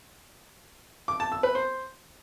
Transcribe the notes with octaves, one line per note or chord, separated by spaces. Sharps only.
D6
A5
E6
B4
C5